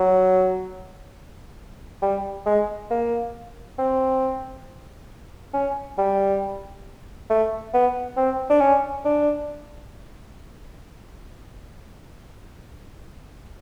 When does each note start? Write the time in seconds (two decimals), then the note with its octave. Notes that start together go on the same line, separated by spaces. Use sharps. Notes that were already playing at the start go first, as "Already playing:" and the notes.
Already playing: F#3
2.02 G3
2.46 G#3
2.90 A#3
3.79 C4
5.54 C#4
5.98 G3
7.30 A3
7.74 B3
8.17 C4
8.50 D4
8.61 C#4
9.05 D4